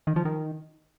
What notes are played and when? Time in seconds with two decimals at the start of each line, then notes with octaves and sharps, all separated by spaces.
0.07 D#3
0.16 F3
0.25 D#3